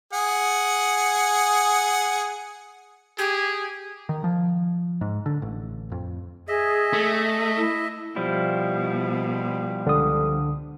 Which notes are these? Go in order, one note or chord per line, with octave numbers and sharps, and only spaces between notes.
G#4 F#5
G4 G#4
D#3
F3
G#2
D3
A1
F2
G#4 D#5 E5
A3
E4
B2 F3 G3 E4
C#2 D3 D#6